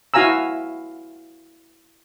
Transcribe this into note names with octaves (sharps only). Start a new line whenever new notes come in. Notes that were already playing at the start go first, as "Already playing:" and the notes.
E4 F#4 F5 G#5 A#5 E6